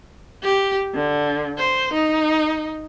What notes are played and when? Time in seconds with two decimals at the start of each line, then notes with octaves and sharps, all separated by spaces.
0.44 G4
0.95 D3
1.58 C5
1.93 D#4